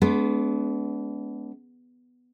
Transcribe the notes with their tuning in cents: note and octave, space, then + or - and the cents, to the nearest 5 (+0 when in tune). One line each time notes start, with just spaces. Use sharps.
G#3 +40 B3 +10 D4 -35